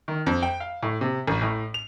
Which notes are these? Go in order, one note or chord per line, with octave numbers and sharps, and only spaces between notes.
D#3
F2
G5
F5
A2
C3
A1
A2
F7